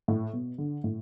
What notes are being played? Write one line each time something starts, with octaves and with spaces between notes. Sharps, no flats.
A2
B2
D3
A2